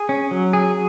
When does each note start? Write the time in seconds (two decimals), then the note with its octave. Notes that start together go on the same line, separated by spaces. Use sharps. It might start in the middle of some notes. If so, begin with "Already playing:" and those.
Already playing: G#4
0.09 C#4
0.31 F#3
0.53 G#4